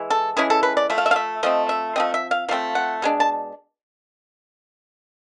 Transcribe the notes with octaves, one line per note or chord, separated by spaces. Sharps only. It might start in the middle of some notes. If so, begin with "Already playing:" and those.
Already playing: E3 G#3 E4
A4
E3 G#3 C#4 E4 G#4
A4
B4
D5
F3 A3 E5
F5
E5
F5
E5
F3 A3 C4 D#5
E5
F3 A3 C4 D#5
E5
F5
F3 A3 C4 F5
F#5
B2 G#3 D4
A5